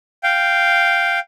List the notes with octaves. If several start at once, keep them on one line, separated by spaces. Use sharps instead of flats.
F5 G5